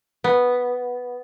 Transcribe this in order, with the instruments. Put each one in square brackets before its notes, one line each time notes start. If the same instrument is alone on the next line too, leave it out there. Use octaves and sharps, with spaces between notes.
[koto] B3